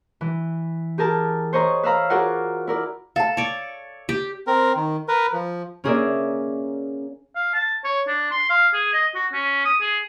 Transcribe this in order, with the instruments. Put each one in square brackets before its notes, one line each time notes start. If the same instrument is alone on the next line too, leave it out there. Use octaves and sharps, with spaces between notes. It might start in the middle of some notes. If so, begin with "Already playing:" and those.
[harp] E3
G4 G#4 A#4 A5
C5 C#5 D#5 A#5 B5
B4 E5 F5 A#5 B5
F4 F#4 G#4 A#4 D5 F#5
E4 A#4 D5
[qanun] A4 [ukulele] F5 A5
[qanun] C#5 D5
G4
[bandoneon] C4 A#4
D#3
A#4 B4
F3
[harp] A#3 C#4 G#4 A#4 D5 E5
[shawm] F5
A5
C#5
D4
C6
F5
G#4
D#5
F#4
C#4
D#6
G#4